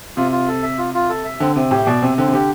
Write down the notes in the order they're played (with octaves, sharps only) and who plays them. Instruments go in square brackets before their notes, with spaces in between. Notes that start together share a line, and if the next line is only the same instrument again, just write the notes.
[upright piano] C3 [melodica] F4
[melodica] F4
A4
E5
F4
F4
A4
E5
[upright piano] D3 [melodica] C4
[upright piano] C3 [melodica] C4
[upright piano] A2 [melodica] G4
[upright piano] B2 [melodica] D5
[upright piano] C3 [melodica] C4
[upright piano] D3 [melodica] C4
[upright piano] C3
[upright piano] D3 [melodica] G4